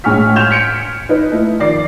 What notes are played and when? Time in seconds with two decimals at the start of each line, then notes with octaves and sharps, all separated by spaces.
0.04 A2 G#3 G#5 C#6 F6 B6
0.36 C6 G6 G#6 E7 F7
0.50 B6 C#7 D7
1.09 D#4 B4
1.32 A3 E4
1.59 D#3 F3 D5 C7